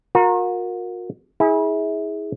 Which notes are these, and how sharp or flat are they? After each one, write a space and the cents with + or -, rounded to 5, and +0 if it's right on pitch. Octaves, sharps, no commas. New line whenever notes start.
F#4 -45 A#4 +0
E4 -30 G#4 +0